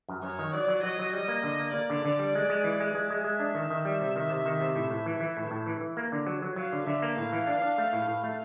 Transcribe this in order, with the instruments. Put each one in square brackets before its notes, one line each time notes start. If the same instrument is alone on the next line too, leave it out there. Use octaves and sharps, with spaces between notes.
[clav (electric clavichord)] F#2
[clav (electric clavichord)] F#2 [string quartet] C#5
[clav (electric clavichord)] D#3
[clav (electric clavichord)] F#3 [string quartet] D5
[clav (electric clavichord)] F#3
[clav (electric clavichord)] F#3 [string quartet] D#5
[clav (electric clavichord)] F#3
[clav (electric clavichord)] G3 [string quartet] D#5
[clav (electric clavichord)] A#3
D3
A#3
[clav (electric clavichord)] A#3 [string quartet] D5
[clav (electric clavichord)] D3
D3
G3
G#3
G#3
E3
G#3
[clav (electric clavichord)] G#3 [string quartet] E5
[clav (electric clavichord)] G#3
G#3
D4
D#3
D#3
G3
C3
D#3
C3
D#3
C3
A2
A2
E3
E3
A2
A2
E3
E3
A#3
D3
F#3
F#3
[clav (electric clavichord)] F#3 [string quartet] F5
[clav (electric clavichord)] D3
[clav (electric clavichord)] D3 [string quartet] E5
[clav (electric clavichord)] A#3
[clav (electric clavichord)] A2 [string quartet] F5
[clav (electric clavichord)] E3
D4
D4
A3
A2
A2
A3